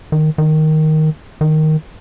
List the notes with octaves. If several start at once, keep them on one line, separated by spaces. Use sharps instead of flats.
D#3
D#3
D#3